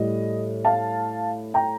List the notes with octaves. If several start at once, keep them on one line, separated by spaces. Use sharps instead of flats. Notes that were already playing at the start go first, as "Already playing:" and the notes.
Already playing: A2 G3 D#5
F5 A5
G5 A#5